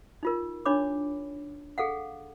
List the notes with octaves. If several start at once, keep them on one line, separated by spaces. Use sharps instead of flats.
D#4 F4 A#4
D4 D#4 C#5 B5 D6
G#4 A4 F5 F#5